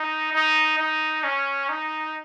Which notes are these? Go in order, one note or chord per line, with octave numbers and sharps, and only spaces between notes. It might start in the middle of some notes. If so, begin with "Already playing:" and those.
Already playing: D#4
D#4
D#4
C#4
D#4